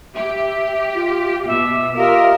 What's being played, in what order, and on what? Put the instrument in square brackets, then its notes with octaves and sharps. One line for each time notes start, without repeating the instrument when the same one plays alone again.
[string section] G4 [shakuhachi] E5
[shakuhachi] F4
[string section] B2 [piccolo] E5 [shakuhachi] D6
[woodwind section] F4 D#5 [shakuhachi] G4 [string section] A#4 [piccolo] E5